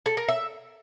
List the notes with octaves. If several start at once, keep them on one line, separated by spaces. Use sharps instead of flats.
A4
A#4
E5